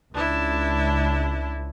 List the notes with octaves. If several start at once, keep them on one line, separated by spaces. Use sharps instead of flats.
C#2 D4 E4